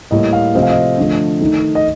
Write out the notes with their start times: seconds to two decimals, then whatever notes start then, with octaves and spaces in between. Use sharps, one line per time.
0.11 A2 G3 A#3 D#5
0.33 F5
0.55 C3 F3 A3 C4 D#5
0.63 F5
0.70 D#5
0.98 D3 F3 A3
1.41 D#3 A3 D#4
1.75 D#5